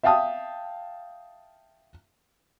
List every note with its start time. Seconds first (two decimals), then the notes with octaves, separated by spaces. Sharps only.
0.03 E5 F5 G5 A5 D#6